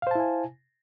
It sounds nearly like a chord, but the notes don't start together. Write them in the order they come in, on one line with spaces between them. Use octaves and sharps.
F5 C5 A5 E4 G#5